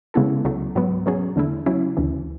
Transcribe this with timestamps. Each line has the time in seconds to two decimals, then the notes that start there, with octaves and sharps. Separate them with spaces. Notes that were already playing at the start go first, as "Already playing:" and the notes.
0.14 C#3 G#3 B3 E4 A4
0.45 C#2 C#3 F#3 A3
0.75 G#2 F#3 B3
1.06 B2 F#3 C#4 G#4
1.36 E2 D3 A3 E4
1.66 C#3 F#3 C#4 E4
1.97 D2 C#3 E3